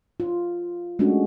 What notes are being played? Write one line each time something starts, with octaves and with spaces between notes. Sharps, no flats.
F4
G#3 A3 C#4 D4 F#4